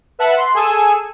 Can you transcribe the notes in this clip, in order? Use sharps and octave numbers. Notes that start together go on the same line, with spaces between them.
B4 E5 F#5 A5 F#6
C6
G#4 A4 G#5 E6